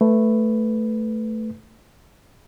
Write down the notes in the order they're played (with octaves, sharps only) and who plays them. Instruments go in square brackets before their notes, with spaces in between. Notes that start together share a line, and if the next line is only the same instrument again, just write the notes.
[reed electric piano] A3 B4